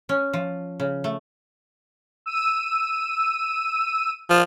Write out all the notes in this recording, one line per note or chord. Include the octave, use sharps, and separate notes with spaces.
C#4
F3
C#3
A3
E6 D#7
F3